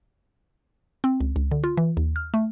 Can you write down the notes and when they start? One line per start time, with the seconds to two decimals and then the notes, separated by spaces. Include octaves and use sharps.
1.04 C4
1.21 C#2
1.36 C#2
1.51 D3
1.64 F4
1.77 E3
1.97 D#2
2.16 F6
2.34 A3